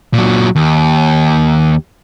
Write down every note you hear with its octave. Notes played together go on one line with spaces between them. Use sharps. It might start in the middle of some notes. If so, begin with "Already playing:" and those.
A#2 F#3
D#2